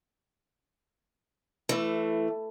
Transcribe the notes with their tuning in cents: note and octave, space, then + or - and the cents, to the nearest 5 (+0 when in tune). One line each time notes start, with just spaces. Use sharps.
E3 +15 A3 +0